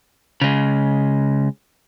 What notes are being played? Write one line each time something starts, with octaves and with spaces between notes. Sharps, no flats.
C#3 G#3